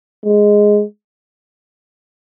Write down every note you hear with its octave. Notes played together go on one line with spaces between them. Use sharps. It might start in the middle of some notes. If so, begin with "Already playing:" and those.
G#3